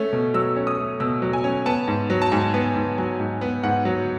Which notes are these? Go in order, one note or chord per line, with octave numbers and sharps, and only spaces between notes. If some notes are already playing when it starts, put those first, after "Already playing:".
Already playing: A3 C#4
B2
F#3 E6
C#4
D#6
A3
B2 E6
F#3
G#5
C#4
B3 A5
G#2
F#3
A5
G#2 G#5
B3
G#2
F#3 G#5
G#2
B3
G#2 F#5
F#3